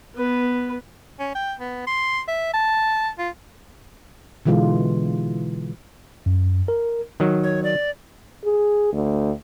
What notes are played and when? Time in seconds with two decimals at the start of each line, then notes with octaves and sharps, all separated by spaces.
0.15 B3 B4
1.20 C#4
1.35 G5
1.60 B3
1.87 C6
2.28 E5
2.53 A5
3.18 F4
4.45 B2 D3 E3 G#3 F4
6.26 F#2
6.68 A#4
7.20 D#3 F#3
7.43 C#5
7.64 D5
8.44 G#4
8.93 D2